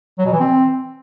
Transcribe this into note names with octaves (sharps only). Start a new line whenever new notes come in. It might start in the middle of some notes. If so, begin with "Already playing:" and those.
F#3
B2
E3
C4